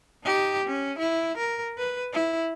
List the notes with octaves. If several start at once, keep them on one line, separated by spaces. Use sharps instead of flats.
D#4 G4
C#4
E4
A#4
B4
E4